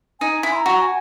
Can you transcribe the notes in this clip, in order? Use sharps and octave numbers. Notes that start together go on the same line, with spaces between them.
D#4 G#5
E4
C6
A#5
F#4
G#5